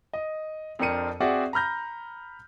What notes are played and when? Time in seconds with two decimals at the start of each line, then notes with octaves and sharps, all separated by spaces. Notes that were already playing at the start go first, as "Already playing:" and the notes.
0.13 D#5
0.79 F2 C4 D4 A#4 C#7 D#7
1.20 C4 F#4 G#4 D5 E5 F#5
1.53 A#5 B5 F6 G6 A#6